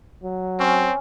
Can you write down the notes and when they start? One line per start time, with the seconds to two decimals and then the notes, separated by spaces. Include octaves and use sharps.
0.23 F#3
0.59 C4 C#4